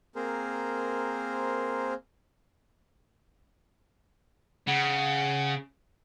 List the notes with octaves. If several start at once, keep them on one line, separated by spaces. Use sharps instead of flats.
A#3 C4 G#4 A#4 C5
C#3 F#5